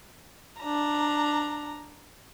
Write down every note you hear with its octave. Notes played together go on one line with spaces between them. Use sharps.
D4 A#5